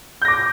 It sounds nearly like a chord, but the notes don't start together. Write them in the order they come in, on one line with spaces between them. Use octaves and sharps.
G6 A#6 D6